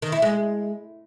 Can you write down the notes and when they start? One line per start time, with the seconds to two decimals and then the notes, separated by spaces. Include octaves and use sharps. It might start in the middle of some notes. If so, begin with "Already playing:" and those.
0.02 D#3
0.12 E4
0.22 G#3